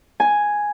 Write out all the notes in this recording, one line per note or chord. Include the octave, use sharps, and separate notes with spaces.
G#5